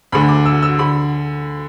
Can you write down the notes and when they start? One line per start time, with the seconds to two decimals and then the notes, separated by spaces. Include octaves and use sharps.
0.12 D2 D3 B5
0.29 D6
0.46 E6
0.63 E6
0.79 D3 B5